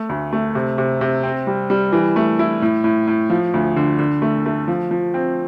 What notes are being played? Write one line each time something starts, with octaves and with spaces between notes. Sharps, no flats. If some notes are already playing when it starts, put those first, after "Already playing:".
Already playing: A3
D2
A3
C3
C3
C3
C4
G3
G3
E3
A3
E4
A2
A2
A2
F3
D2
D3
D3
A3
A3
F3
F3
C4